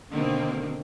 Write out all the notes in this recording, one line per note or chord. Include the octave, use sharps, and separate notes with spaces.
B2 D3 D#3 A#3 C4